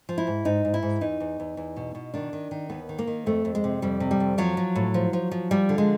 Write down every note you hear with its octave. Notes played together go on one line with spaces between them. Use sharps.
F3
E4
G#2
G#2 D#4
G#2
E4
G#2
E2 D#4
E2
E2
E2
B2
B2
D#3 D4
D#3
D#3
D#2 B3
D#3
A#3
D#3
F2 A3
F2
G#3
C3
F2 G3
C3
G3
F2
F3 F#3
F3
A2
F3
F3
F3
F3 G3
D3
G#3